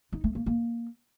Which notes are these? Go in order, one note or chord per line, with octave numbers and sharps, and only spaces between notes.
D#4
A3
A#3
A#3